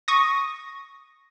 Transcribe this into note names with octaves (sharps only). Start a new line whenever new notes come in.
C#6 D#6 A#6